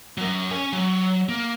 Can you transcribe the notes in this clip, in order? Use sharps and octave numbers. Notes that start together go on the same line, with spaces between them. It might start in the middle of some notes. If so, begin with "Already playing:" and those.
F#3 A#4
C#4 G#5
F#3
A#3